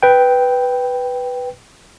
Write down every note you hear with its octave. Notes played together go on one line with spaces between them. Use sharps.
B4 G5